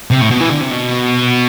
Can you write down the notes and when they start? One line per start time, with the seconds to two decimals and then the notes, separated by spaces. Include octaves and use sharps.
0.11 C3
0.21 A2
0.31 B2
0.40 E3
0.51 D3
0.61 C3
0.71 B2